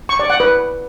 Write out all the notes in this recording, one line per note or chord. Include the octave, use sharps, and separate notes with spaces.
C#6
D5
F#5
B4